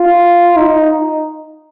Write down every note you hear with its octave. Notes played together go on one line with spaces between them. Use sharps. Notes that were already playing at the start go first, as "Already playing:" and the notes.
Already playing: F4
D#4